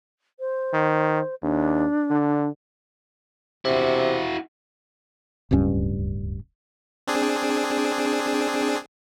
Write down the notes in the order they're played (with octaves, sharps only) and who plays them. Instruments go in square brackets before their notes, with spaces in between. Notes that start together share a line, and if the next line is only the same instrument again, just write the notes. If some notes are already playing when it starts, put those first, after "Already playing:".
[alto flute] C5
[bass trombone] D#3
[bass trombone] D#2 [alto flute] D4
[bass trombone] D3
[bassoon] C3 [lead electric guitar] E4 F#4
[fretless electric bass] D1 C#2 G2 C#4
[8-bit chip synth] C4 D4 G#4